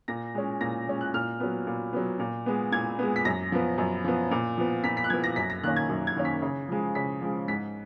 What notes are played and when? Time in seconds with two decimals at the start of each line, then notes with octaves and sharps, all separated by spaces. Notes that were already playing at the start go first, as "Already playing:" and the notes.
0.08 A#2 A#6
0.35 G#3 C#4
0.61 A#2 A#6
0.88 G#3 C#4
1.01 F#6
1.14 A#2 F6
1.40 F#3 B3
1.67 A#2
1.93 F#3 B3
2.19 A#2
2.46 G#3 B3
2.72 A#2 G#6
2.99 G#3 B3
3.16 B6
3.25 F#2 A#6
3.52 F3 B3
3.78 F#2
4.04 F3 B3
4.31 A#2
4.58 F3 B3
4.84 A#2 B6
4.97 B6
5.04 F#6
5.10 F3 B3 G#6
5.24 A#6
5.36 F#2 B6
5.50 A#6
5.63 D#3 A#3 C#4 F#6
5.76 G#6
5.89 F#2
6.07 G#6
6.16 D#3 A#3 C#4
6.25 B6
6.42 C#3
6.69 F3 G#3
6.95 C#3 B6
7.22 F3 G#3
7.48 G#2 B6